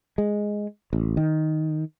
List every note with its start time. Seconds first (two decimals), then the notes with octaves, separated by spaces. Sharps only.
0.18 G#3
0.93 A1
1.17 D#3